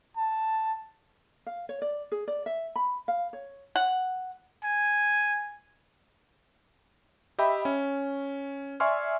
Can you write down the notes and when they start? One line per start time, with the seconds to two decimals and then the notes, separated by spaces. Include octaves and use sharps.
0.17 A5
1.47 F5
1.69 C#5
1.82 D5
2.12 G#4
2.28 D5
2.46 E5
2.76 B5
3.08 F5
3.33 C#5
3.76 F#5
4.64 G#5
7.39 G4 D#5 E5 G5 B5
7.65 C#4
8.80 D5 E5 G#5 C6 C#6 F6